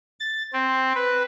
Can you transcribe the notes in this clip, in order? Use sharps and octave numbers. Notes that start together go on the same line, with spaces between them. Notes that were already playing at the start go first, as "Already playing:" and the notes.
A6
C4
B4